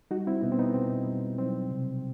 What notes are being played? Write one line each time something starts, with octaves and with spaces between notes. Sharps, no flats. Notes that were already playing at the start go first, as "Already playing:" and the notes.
G3 D#4 F#4
C4 E4
B2 B3 D#4
C4
B3 D#4
B2 C4
G3
F#3 C4
C3